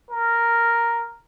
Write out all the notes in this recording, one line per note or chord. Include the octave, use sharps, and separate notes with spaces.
A#4